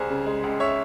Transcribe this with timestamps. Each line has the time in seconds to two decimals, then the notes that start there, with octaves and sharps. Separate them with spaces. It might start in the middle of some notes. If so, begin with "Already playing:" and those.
Already playing: C2 G#4 C5
0.10 C#3
0.26 G#3
0.43 C#2
0.60 C#5 E5